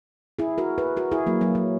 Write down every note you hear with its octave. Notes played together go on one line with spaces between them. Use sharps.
E4 G#4
F#4 A#4
G#4 B4
F#4 A#4
E4 G#4
F#3 A#3
F#3 A#3
F#3